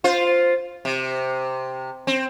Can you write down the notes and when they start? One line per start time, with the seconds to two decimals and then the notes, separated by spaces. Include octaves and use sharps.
0.04 F4 C5
0.85 C3
2.07 C4